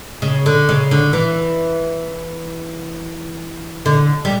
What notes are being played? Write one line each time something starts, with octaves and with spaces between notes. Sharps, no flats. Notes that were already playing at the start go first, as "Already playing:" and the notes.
C#3
D3
C#3
D3
E3
D3
G3